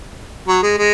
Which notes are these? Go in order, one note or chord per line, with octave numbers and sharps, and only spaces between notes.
F#3
G#3
G#3